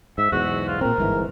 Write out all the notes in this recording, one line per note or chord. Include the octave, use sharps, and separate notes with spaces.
G#2 E5
B1 E2 G#2 F#4
F4
A#2 C4 A#4
G1 G#2 E3